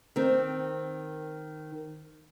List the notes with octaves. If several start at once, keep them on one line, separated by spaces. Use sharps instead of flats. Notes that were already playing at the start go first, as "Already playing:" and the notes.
D#3 C4